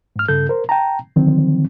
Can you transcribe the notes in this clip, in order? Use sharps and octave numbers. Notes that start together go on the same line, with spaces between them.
G#2 F6
G2 C#3 A4 G6
A#4 C5
G5 A5 A#5
D3 D#3 F3 F#3 C4